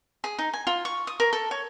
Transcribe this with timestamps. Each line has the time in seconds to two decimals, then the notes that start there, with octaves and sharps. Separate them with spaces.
0.24 G#4
0.39 D#4
0.53 G#5
0.67 F4
0.85 C#6
1.07 D#6
1.20 A#4
1.33 A4
1.51 C#5